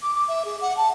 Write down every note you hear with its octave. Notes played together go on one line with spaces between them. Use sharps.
D6
D6
E5
G#4
F#5
A5